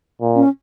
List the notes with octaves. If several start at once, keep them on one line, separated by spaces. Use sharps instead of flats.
A#2
C#4